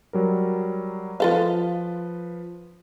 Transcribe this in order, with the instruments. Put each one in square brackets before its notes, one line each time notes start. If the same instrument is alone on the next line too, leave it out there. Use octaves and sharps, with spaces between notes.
[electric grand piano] F#3 G3 A#4
[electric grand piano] F3 B4 [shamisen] F4 A4 F5